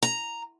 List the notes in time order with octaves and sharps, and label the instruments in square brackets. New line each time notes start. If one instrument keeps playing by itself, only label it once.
[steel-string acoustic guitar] A#5